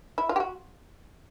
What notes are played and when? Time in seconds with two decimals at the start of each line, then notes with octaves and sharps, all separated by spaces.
0.18 E4
0.29 F4
0.36 G4
0.40 F#4